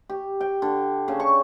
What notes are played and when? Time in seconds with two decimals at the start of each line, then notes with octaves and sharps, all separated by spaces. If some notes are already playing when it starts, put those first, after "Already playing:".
0.09 G4
0.41 G5
0.62 D3
1.08 C#3
1.20 C#6